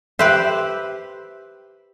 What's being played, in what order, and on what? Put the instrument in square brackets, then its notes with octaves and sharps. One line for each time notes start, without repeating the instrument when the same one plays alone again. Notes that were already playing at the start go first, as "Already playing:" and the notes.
[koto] G4 B4 C5 [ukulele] E5